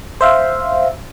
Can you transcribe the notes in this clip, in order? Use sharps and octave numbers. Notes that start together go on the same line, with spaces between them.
C5 E5 F5